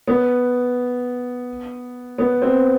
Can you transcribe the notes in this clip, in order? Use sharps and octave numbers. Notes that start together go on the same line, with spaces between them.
B3
B3
C4